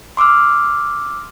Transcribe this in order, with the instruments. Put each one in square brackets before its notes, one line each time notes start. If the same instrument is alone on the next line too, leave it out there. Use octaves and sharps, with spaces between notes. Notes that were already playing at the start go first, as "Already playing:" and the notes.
[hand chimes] C6 D6 E6 F6